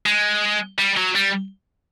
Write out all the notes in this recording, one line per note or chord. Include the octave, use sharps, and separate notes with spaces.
G#3
G3
F#3
G3